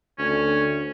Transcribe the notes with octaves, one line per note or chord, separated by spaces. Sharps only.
D2 C#4